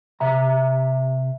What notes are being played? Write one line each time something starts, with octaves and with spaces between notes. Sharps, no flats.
C3 E5 A#5